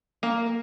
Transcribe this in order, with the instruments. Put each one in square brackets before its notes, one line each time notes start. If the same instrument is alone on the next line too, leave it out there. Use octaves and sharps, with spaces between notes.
[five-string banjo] A#3